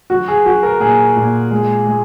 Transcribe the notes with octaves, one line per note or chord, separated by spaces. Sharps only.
F#3 F#4
G#4
F#3 F#4
A#4
A#2 G#4
A#2
G#3
G#3